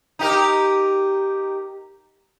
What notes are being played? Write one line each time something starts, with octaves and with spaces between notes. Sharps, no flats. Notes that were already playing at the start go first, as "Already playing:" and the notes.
D#4 G4 A#4